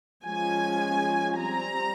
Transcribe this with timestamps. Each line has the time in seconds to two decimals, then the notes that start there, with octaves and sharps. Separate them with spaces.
0.25 F3 G#3 C#4 G#5
1.38 G3 C4 A#5